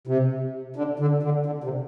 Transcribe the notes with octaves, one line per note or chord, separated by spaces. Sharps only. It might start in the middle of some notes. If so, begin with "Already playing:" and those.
C3
D3
D3
D3
D3
C3